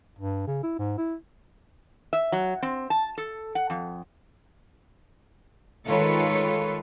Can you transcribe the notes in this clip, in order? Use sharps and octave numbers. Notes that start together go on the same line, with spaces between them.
G2
C#3
E4
G#2
E4
E5
F#3
C4
A5
A4
F#5
F2
D#3 G#3 F4 A4 B4 C#5